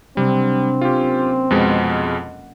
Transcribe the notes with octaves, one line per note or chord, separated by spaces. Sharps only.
C3 F#3 G3 C4 D4
A#3 C#4 F4 G4
F2 B2 G#3 D#5 F#5